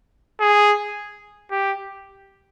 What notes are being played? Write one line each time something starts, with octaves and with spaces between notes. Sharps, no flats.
G#4
G4